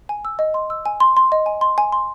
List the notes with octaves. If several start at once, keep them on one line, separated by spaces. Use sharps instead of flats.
G#5
E6
D#5
C6
E6
G#5
C6
C6
D#5
G#5
C6
G#5
C6